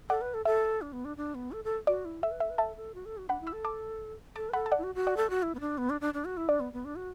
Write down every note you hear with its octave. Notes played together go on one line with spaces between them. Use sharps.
A4 D5 F#5
B4
A4
A4 E5
D4
B3
D4
D4
B3
A4
A4
F#4 D5
E4
A4 E5
B4
A4 E5
B4
A4 E5 A5
A4
F#4
A4
F#4
D4 F#5 B5
E4
B5 E6
A4
A5 D6
A4 A5 D6
B4
A4 F#5 B5
A5
D5 F#5
E4
F#4
F#4
D5 F#5
A4
F#4
E4
B3
D4
B3
D4
D4
D4
F#4
E4
D4 D5
B3
B3
D4
F#4